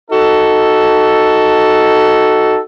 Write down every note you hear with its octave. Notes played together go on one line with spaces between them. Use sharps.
D#4 F#4 A4